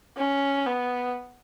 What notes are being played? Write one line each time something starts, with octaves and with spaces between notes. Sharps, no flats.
C#4
B3